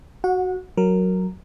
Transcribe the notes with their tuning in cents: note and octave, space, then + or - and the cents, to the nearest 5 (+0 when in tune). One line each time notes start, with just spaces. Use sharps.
F#4 +0 F#5 -25
F#3 +0 A#4 -10